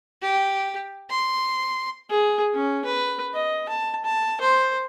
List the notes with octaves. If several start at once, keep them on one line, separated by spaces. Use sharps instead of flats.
G4
C6
G#4
C#4
B4
D#5
A5
A5
C5